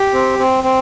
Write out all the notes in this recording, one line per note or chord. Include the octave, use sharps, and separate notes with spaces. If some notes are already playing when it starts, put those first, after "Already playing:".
Already playing: G4
C4
C4
C4